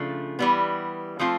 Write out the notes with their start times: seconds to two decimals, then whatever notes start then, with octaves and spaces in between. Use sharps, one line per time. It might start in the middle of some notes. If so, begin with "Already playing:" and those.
Already playing: C#3 F3 A3 D4 F4
0.39 E3 G3 B3
1.19 F3 A3 C4 F4